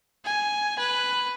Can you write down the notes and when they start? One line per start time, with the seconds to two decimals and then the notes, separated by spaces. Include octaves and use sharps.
0.25 G#5
0.79 B4